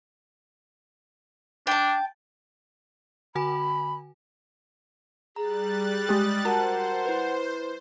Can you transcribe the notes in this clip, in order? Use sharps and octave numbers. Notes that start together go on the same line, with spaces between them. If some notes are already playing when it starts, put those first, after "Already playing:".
D4 G5 A5
D3 F#4 G#5 B5
G3 G#4 A#5 F#6 A6
G#3 G4 D#6
F#4 A#4 C5 F#5 A5 A#5
E4 B4